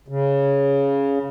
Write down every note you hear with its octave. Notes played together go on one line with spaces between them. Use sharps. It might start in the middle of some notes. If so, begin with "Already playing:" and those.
C#3